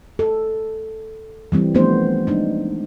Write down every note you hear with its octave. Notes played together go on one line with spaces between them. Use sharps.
A4
E3 G3 C4
F3 A3 B3 C4 D4 C5
G#3 D4 D#4